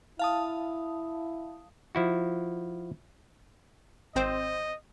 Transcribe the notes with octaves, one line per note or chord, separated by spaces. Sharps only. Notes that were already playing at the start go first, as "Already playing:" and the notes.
E4 F5 A5 D#6
F3 E4 F#4
G#1 C4 C5 D#5